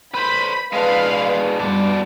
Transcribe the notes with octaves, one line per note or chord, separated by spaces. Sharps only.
B4 C5 B5
G#3 D4 B4 F5
G2 B2 D5